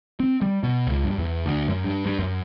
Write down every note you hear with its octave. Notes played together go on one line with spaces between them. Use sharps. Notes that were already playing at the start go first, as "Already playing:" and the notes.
C4
G3
B2
C#2
G2
E2
D2
F#2
G2
G2
F#2